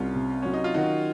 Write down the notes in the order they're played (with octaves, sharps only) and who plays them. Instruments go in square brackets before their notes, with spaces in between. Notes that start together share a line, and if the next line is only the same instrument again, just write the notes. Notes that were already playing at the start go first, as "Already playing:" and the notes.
Already playing: [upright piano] C2 [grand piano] C#4 F4
[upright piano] C3
[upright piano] F#3 [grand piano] C#4
[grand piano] D#4
F4
[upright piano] D#3 [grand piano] D#4 F#4